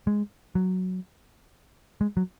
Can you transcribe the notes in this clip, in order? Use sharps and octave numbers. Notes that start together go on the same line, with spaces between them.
G#3
F#3
G#3
F#3